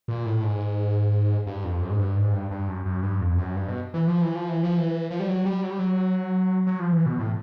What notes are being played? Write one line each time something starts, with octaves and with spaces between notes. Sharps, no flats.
A#2
A2
G#2
G2
F2
F#2
G#2
G2
G#2
G2
G2
F#2
F#2
G2
F2
F#2
G2
B2
E3
F3
E3
F3
E3
F3
E3
F3
G3
F#3
G3
F#3
G3
F#3
F#3
F3
E3
B2
A2